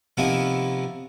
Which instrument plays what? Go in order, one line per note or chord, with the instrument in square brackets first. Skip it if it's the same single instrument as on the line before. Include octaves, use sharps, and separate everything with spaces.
[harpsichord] C3 D#3 F3 A#3 B3 E4